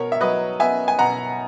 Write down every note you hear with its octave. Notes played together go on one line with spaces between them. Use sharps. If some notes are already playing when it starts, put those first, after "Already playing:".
Already playing: B2 A#4 C#5
E5
F#3 B4 D#5
B3 E5 G#5
G#5
B2 F#5 A#5